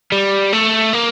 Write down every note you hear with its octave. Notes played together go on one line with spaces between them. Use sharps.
G3
A3
A#3